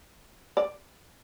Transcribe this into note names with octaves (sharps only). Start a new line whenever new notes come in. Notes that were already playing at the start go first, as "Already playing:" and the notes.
D5